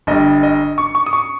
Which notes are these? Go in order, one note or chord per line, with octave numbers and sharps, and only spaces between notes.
G1 G2 G3 D#5
D#5
C#6
C#6
D#6
C#6